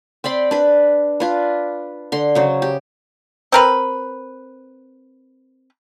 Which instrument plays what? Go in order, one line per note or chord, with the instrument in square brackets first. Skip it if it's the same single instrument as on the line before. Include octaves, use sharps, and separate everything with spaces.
[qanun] C4 D5 B5 C6
D4 B4
D4 F4 B4
D3 C6
C#3 F#3 C5
G4
[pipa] C4 A#4 B4